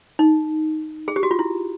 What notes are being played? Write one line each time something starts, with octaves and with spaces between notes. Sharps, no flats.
D#4
G#4
G4
F#4
F4
E4